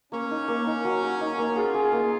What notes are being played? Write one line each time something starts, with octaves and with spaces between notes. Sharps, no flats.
A#3 C#4
D#4
A#3
D#4
F#3
A#4
D#4
A#3
F4 G#4
G#4
A#3